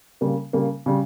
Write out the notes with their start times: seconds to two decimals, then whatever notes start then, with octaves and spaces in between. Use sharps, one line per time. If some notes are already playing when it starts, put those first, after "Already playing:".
0.21 C#3 G3 A#3
0.53 C#3 G3 A#3
0.86 C#3 G3